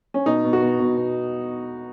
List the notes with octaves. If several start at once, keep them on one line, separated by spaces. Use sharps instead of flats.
C#4
B2 D#4
B2
F#4
B2
B2
B2